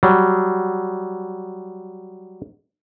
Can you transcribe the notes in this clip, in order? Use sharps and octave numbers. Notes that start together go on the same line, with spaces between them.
F#3 G3